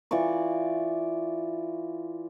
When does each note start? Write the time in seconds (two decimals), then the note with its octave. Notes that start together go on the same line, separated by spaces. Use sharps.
0.11 E3 F4 D5 C#6